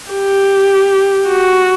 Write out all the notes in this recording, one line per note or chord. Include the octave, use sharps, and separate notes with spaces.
G4
F#4